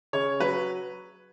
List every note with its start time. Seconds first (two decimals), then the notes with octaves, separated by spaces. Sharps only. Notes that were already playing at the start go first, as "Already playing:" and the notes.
0.13 C#3 C#5
0.40 F#3 B4